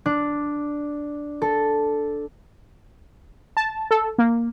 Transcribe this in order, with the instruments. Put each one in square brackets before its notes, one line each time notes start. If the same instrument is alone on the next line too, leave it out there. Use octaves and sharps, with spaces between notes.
[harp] D4
A4
[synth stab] A5
A4
A#3